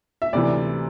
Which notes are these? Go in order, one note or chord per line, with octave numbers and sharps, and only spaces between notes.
E5
D2 C3 E3 D5